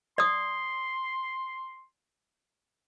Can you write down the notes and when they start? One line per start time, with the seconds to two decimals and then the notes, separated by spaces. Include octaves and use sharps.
0.18 D5 C6 D#6